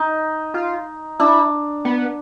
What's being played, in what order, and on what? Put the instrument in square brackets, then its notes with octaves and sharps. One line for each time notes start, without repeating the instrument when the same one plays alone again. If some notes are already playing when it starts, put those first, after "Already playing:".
Already playing: [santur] D#4
[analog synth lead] F4
[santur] D4 [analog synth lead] E4
[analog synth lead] B3